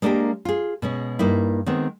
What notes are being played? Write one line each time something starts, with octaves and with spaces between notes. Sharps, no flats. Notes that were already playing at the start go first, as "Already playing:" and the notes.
G#3 A#3 D4 F#4 G4 A#4
F4 G#4
B2 G#3 C#4
G2 A#3 D#4 E4
D#3 G#3 B3 C4